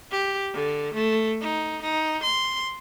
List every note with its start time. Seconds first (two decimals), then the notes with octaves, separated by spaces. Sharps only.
0.11 G4
0.53 D3
0.94 A3
1.41 D#4
1.82 D#4
2.23 C6